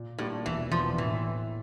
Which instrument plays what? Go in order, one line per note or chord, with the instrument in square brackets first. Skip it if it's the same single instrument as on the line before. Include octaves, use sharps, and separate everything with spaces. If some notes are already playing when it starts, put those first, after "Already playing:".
Already playing: [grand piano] A#2
[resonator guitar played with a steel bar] A2 [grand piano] G3 A#3 D4 F4
[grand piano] E1 [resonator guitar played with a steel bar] E3
[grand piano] E2 E3 A#3 D4 [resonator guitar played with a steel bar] F3
[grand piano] A2 [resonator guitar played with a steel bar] E3